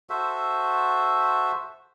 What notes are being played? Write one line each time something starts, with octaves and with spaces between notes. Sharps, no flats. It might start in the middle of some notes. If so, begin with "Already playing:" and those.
F#4 A4 C5 E5